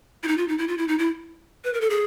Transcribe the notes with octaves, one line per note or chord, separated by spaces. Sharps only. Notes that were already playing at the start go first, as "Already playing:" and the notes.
E4
D#4
F4
D#4
E4
F4
E4
D#4
E4
B4
A#4
A4
G#4